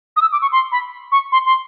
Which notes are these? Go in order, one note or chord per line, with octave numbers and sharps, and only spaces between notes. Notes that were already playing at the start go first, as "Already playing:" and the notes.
D#6
E6
D6
C#6
C6
B5
C#6
C6
C6